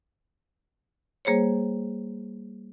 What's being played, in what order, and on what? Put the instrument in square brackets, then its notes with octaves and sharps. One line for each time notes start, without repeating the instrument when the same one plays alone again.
[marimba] G3 A#3 G#4 C5 C#5